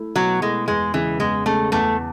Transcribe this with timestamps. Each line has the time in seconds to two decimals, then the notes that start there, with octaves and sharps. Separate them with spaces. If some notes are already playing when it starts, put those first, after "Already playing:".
Already playing: A3 E4
0.16 B2 F#3
0.42 G#3 A3 E4
0.68 E2 G#3
0.94 C#3 E3 G#3
1.20 E2 G#3
1.45 C#3 G#3 A3
1.72 E2 A3